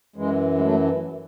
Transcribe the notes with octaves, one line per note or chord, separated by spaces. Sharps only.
F#2 E3 G#3
G#3
F#3 A3